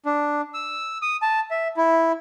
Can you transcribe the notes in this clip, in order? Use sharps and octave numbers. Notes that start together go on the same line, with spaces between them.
D4
E6
D#6
A5
E5
E4